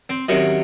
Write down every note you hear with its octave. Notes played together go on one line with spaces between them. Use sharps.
C4
C3 D#3 F#3 C#4